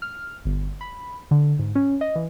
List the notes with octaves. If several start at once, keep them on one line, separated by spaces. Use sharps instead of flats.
F6
G1
B5
D3
G#2
C#4
D#5
E3